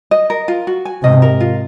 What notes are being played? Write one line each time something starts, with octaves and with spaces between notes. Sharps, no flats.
D#5
A#4
F4
F#4
G#5
G#2 C3 D#5
A#4
F4